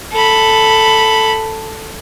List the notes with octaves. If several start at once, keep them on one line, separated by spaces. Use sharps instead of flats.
A4 B5